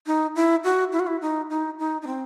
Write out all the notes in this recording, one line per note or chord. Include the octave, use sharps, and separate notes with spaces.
D#4
E4
F#4
E4
F#4
E4
D#4
D#4
D#4
D#4
C4